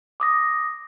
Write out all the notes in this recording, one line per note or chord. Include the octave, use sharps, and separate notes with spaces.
D6 D#6 A#6